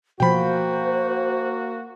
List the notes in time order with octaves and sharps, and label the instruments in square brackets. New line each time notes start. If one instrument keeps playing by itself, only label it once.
[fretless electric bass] B2 F3 [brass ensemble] A#3 F#4 [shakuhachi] C5 [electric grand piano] G5 B5